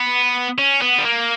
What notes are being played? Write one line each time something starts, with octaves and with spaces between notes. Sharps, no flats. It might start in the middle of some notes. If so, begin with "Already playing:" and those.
Already playing: B3
C#4
B3
G3
A#3